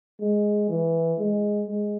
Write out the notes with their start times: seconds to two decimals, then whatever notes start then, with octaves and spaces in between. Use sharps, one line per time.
0.20 G#3
0.69 E3
1.19 G#3
1.68 G#3